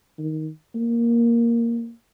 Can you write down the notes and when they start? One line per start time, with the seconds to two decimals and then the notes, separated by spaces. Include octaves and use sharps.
0.19 D#3
0.75 A#3